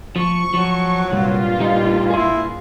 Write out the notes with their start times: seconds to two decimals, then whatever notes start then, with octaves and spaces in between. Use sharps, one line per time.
0.16 F3 C#6
0.54 F3 F#3
1.11 C2 G2 A#2 F4
1.60 G3 D#4
2.10 E4 G#4 C6